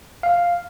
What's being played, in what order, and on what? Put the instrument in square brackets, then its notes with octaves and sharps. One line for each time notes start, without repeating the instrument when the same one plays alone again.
[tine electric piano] F5